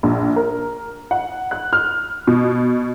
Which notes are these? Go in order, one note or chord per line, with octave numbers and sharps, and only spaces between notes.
A#1
A#4
F#5
F#6
F6
B2